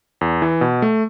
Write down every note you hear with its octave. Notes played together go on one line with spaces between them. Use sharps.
E2
E3
B2
A3